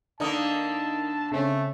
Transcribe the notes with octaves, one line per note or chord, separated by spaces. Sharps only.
D3 A#3 D#4 A#4 D#5 A5
C#3 A3 C4 C#4